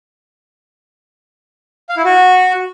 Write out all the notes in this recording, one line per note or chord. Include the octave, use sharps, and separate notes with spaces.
F5
E4
F#4